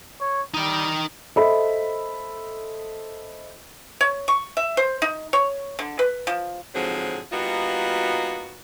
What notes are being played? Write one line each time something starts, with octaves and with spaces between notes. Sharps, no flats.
C#5
G3 D#4 G5
A4 C5 D#5 E5 B5
C#5
C#6
E5
C5
D#4
C#5
D3
B4
F3
G#2 D3 F3 F#3 C4 G#4
G3 A#3 B3 D#4 F4 F#4